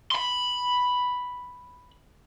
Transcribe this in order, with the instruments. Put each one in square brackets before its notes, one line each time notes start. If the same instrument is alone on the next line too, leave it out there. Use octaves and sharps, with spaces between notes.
[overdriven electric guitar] B5 C6